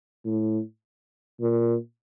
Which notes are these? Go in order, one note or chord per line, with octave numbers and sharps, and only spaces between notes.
A2
A#2